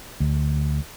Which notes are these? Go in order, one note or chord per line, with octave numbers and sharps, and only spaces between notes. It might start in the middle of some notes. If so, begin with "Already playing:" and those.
D2